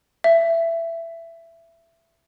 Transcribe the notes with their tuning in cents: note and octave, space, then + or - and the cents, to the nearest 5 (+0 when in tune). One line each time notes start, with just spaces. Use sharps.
E5 +15